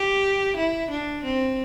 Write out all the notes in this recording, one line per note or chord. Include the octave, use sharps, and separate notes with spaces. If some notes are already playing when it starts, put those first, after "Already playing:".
Already playing: G4
E4
D4
C4